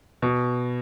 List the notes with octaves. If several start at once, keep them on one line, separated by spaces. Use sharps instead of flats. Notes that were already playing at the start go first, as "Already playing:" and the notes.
B2